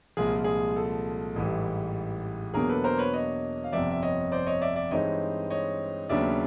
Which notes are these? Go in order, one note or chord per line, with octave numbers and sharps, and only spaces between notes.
C2 A#2 F3 G#3 G#4
G#4
A4
A1 G#2 E3 G3
E2 B2 F#3 A#3 D4 G#4 A#4
A4 B4
A#4 C5
B4 C#5
C#5 D#5
F5
G1 F2 C3 F3 D5 E5
E5
C#5 D#5
C5 D5
C#5 D#5
D5 E5
D5 E5
G2 E3 G#3 C4 D#4 C#5 D#5
C#5 D#5
D#2 C#3 F#3 B3 D4 D5 E5